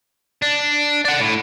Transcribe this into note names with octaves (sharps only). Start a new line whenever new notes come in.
D4
D5 F#5
A2